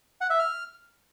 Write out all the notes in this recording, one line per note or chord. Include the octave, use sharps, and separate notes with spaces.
F#5
E5
F6